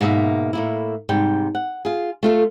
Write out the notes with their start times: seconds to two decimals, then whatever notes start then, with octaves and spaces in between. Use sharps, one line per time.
0.01 G#2 B2 A#3 E5
0.53 A2 A#3 E4
1.09 G#2 C3 G3 G5
1.55 F#5
1.85 F4 G#4
2.23 A3 F4 A4